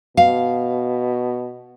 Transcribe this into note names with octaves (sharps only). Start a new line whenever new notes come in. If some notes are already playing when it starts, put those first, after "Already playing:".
B2 F5